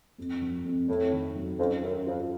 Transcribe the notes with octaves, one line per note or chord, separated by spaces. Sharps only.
F2
F3
F2
F2 A2
D#3
F#3
F2 C#4
F#2 C#4
F2 F4